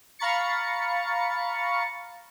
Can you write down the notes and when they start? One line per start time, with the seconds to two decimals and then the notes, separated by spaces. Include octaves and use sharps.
0.19 F5 A#5 B5 C#6 A6 C#7